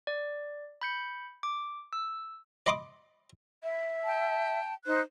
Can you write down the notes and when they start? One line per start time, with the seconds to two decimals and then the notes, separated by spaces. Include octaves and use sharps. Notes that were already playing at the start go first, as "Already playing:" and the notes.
0.07 D5
0.81 B5 G6 C#7
1.43 D6
1.93 E6
2.66 D5 D#5 B5 C6 D6 D#6
3.63 E5
4.06 G5 A5
4.86 D#4 C5 F#6